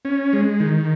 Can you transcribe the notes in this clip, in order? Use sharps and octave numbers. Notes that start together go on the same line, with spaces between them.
C#4
G#3
D#3